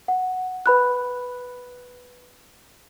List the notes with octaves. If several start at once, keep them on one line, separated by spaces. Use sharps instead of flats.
F#5
B4 B5 F#6